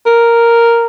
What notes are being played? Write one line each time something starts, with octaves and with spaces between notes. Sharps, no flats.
A#4